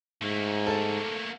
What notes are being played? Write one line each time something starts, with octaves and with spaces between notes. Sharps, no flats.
G#2 A3 A#3
A4